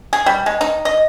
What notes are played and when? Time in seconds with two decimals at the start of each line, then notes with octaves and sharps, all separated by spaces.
0.13 G#4
0.26 G3
0.46 G#3
0.61 D#4
0.85 D#5